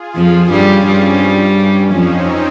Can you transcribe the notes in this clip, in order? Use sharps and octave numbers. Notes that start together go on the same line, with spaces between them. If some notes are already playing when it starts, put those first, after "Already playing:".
Already playing: F4 G#4
F2 F3
G2 G3 C#4
G2 G3 C4
C#4
F2 F3 C4 D#4